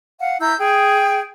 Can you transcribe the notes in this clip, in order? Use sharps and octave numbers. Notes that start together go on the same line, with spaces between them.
F5 F#5
E4 A#5 E6 G6
G#4 G5